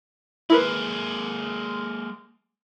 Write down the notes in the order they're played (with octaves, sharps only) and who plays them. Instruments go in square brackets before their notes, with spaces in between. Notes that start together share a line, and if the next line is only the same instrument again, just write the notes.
[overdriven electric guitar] G#3 A#3 [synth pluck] E4 A#4 B4